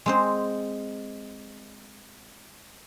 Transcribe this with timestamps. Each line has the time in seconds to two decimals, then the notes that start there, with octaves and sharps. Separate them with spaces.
0.06 G#3 C4 C5